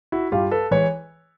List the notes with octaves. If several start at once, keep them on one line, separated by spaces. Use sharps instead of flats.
E4 F#4
G2 F4 G4
A4 B4
E3 G#3 B4 C#5